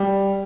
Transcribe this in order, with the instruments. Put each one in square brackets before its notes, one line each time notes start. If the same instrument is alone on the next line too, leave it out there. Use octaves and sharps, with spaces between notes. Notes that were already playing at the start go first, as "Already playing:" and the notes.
Already playing: [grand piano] G3